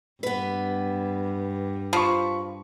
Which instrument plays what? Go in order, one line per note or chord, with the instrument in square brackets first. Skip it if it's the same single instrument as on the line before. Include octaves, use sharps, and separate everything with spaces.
[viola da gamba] G2 [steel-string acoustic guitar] B3 B4
[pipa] F3 [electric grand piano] B5 C#6